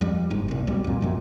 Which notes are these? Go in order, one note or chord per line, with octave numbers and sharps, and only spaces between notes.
F2 G3
F#1 G#2
C2 A#2
C2 B2 G3
F2 A#2
A#1 F#2 A#2